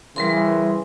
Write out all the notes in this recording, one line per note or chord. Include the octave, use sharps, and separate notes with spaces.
C#3 E3 G3 A#4 C6